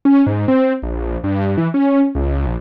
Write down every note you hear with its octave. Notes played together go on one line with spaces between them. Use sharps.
C#4
G#2
C4
A#1
G2
E3
C#4
C#2
A#1